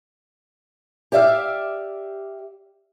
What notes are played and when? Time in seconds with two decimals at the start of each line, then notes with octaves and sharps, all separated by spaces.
1.12 G4 D5 E5 F5